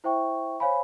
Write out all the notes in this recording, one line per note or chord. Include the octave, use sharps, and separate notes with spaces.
E4 C5 E5 G5 C#6
C5 C#5 F5 G#5 B5